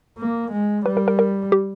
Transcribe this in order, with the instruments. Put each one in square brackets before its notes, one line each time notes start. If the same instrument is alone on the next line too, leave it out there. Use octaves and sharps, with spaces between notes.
[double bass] A#3
G#3
[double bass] G3 [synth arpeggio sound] B4
[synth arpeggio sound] A#4
A#4
A#4
G4